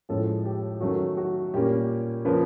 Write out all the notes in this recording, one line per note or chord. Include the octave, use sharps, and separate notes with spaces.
A2 F3 G#3 C#4 A4
G4
D#3 F#3 A3 C#4 F#4
F#4
A#2 G3 A#3 C#4 G4
C#3 F3 A#3 B4